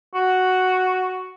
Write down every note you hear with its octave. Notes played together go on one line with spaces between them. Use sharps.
F#4